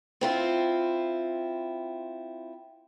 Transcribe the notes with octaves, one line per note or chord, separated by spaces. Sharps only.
C4 E4 F4